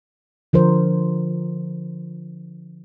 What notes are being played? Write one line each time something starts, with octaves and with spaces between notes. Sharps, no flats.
D3 F3 A#4 C5